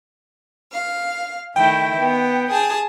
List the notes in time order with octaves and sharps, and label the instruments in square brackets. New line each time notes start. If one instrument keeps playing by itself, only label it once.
[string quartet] F5
[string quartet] D#3 A3 E4 [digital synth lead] G5
[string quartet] B3
G#4 A5